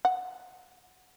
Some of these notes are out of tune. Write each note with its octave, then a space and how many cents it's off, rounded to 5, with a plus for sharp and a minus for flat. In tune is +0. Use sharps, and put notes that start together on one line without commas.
F#5 -5